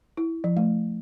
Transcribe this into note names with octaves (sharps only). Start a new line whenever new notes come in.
E4
F3
A3